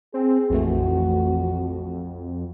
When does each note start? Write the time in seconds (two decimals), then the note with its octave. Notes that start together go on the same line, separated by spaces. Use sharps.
0.14 C4 G#4
0.50 A#1 F2 E3 A3 F#4